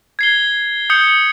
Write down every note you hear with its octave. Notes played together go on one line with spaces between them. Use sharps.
G#6 C7 G7
D#6 G6 C#7